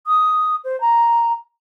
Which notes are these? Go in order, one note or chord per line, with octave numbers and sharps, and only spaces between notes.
D#6
C5
A#5